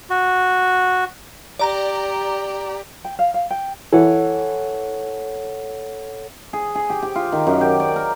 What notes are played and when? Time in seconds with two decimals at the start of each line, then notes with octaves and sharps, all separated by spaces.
0.10 F#4
1.59 G4 D5 A#5
3.05 G5
3.19 F5
3.34 F5
3.50 G5
3.93 E3 A4 C#5 F#5
6.53 G#4
6.75 G#4
6.90 G4
7.02 G4
7.15 F4
7.32 D#3
7.47 F#2
7.61 G4
7.80 D5
7.96 A#4